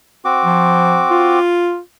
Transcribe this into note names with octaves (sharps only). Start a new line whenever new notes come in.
C4 F#4 D6
F3
F4